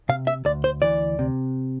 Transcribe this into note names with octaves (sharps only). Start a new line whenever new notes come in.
C3 F5
E5
D2 D5
C5
E3 D5
C3